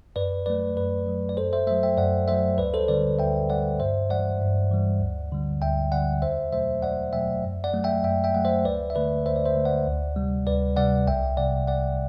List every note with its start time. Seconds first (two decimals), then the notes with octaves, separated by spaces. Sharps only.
0.16 F#2 B4 D5
0.46 F#3 A3 B4 D5
0.77 F#2 B4 D5
1.06 F#3 A3
1.29 D5
1.37 F#2 A4 C5
1.53 C5 E5
1.67 F#3 A3 C5 E5
1.83 E5 G5
1.97 F#2 D5 F#5
2.28 F#3 A3 C5 E5
2.58 D2 B4 D5
2.74 A4 C5
2.88 D3 G3 B4 D5
3.19 D2 E5 G5
3.50 D3 G3 D5 F#5
3.79 G2 C5 E5
4.10 E3 G3 D5 F#5
4.41 G2
4.71 E3 G3
5.01 D2
5.32 D3 G3
5.62 D2 E5 G5
5.91 D3 G3 D5 F#5
6.22 E2 C5 E5
6.52 B2 F#3 A3 C5 E5
6.82 E2 D5 F#5
7.13 B2 F#3 A3 E5 G5
7.44 F#2
7.64 D5 F#5
7.74 F#3 A3
7.84 E5 G5
8.04 F#2 E5 G5
8.24 E5 G5
8.35 F#3 A3 F#5
8.45 C5 E5
8.65 D2 B4 D5
8.90 E5
8.95 D3 A3 B4 D5
9.26 D2 C5 E5
9.36 D5
9.46 C5 E5
9.55 D3 A3
9.65 D5 F#5
9.87 D2
10.16 C3 G3
10.47 D2 B4 D5
10.77 C3 G3 D5 F#5
11.07 C2 E5 G5
11.37 C3 G3 D5 F#5
11.67 C2 D5 F#5